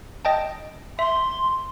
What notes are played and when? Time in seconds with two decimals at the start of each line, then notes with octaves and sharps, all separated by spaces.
0.25 D#5 G5 A5
0.99 E5 C6